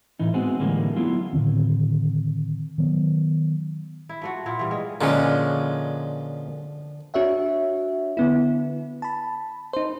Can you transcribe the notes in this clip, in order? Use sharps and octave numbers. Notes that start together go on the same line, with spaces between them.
A2 E3 D#4
G#3 B3 C4 F#4 G#4
A2 D3 E3 G3 G#3 A#3
F#3 B3 E4 F4
A2 D3 D#3 C4
D#3 F#3 B3
E4
F3 A3 F#4
A#2 E4 F4
E3 G3
G#3
A#2 D3 F3 G#3 C#4
D4 F#4 C#5 E5 F#5
D3 B3 E4
A5 B5
D#4 C5